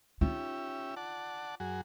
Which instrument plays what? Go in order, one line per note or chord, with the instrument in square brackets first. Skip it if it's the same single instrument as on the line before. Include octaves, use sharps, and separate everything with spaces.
[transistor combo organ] C#4 G4 E5 [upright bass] D#4 F4
[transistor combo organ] D5 F#5 A5
F#2 F#4 G#4